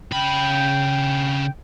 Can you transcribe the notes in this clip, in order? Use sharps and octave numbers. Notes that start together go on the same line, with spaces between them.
C#3 G5 B5